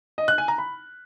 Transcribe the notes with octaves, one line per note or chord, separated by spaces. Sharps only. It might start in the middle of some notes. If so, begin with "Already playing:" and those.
D#5
F#6
G#5
A#5
B5